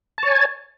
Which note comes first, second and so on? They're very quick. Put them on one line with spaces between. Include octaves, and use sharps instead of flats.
A5 C#5 G#5